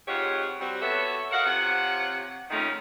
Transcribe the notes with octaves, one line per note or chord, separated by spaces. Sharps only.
F2 G#2 F4 G4 C#5 F#5
G3 C4 F#4
B3 F#4 G4 A4 C#5 E5
F#4 A#4 D#5 F5 F#5
C3 F3 C#5 F#5
F2 D#3 G#3 A3 C#4 D#4